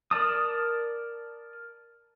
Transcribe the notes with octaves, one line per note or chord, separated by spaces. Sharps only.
A#4 D5 A5 D#6